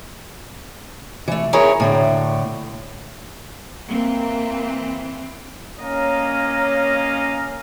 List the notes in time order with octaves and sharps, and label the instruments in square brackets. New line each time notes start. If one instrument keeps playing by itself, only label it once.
[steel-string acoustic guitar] E3 A3
E4 G#4 A#4 C#5
A2 D3 A3
[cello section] E3 C4 [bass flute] A#3
[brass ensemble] A#3 C#4 C#5 D#5 F5 A#5